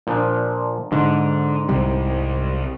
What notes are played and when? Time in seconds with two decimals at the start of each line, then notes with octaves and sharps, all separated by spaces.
0.07 A#2 F3 D4
0.92 G#2 D3
1.68 C2 C3 G3